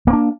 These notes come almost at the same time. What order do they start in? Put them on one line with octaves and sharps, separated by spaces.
A#3 C4 D4